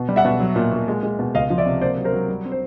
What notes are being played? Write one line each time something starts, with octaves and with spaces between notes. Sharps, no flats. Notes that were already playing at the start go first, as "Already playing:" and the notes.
Already playing: B2
G3
E5 F#5
B2
F#3
A#2
A#2
G#3
G#3
B2
C#2 D#5 F5
F3
D5 E5
C3
A#3 C5 D5
F#3
A#4 C5
F#3
G3
C4
C5